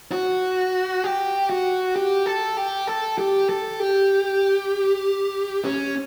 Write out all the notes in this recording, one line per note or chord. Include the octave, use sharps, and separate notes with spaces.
F#4
G4
F#4
G4
A4
G4
A4
G4
A4
G4
C#4